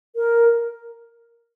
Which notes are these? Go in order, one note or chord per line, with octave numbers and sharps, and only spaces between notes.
A#4